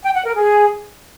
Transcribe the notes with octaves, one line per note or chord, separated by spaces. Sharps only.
G5
F#5
A#4
G#4